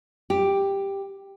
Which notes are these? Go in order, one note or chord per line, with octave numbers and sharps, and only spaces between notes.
G4